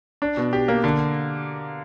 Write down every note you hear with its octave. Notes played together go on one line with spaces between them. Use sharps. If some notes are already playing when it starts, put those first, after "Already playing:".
D4
B2
G4
A#3
D3